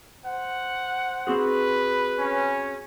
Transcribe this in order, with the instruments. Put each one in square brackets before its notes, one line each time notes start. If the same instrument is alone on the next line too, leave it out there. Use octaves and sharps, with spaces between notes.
[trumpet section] C5 F#5
[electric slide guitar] C4 F#4 G#4 [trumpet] B4
[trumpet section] C#4